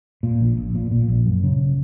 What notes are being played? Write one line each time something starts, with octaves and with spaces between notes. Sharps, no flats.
A#2
A#1
A#1
A#2
A#2
A#1
F#2
C#3